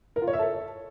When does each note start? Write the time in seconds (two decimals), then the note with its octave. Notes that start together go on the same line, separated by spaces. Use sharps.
0.16 A#4
0.22 F4
0.28 C#5
0.33 E5
0.39 A4